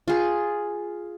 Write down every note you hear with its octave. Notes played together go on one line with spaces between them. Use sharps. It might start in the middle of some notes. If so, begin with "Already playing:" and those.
F4 G#4